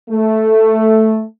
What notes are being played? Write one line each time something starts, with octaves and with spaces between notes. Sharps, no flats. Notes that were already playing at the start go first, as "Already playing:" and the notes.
A3